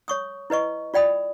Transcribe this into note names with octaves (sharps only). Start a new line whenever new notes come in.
C#5 C#6 D#6
E4 B4 D#5 C#6
F4 D5 G5 B5 D#6